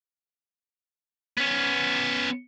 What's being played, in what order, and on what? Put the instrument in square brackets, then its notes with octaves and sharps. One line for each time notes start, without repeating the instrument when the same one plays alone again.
[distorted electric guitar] B3 C#4